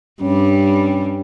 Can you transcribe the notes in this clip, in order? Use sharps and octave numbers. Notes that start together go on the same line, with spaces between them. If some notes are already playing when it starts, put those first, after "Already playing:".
G2 G3 C#4